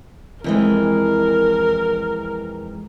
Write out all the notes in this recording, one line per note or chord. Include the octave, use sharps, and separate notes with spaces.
F2 E3 G#3 A#4